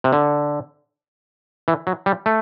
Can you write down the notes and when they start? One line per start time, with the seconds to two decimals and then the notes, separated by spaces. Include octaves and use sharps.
0.04 C3
0.13 D3
1.68 E3
1.87 F#3
2.06 G3
2.26 A3